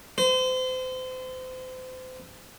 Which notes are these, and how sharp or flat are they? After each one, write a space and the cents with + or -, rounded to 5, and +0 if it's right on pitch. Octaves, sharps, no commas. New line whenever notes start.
C5 -35